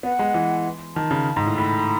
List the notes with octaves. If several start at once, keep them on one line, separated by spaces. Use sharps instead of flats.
B3 F#5
G#3
E3
D#3 A5
C#3
G#2
A2
A2 B5